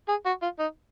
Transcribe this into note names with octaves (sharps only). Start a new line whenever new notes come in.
G#4
F#4
F4
D#4